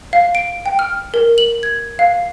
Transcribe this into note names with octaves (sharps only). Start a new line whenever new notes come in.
F5
D7
G5
F6
A#4
F#7
G#6
F5